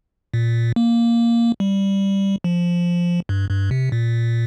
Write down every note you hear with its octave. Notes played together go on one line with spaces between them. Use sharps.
A#2
A#3
G3
F3
G2
G2
C3
A#2